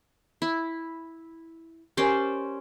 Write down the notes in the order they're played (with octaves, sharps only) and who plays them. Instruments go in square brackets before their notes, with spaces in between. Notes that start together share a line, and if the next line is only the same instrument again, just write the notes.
[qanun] E4
[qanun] C#4 C5 D5 [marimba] G4 A#4 G#5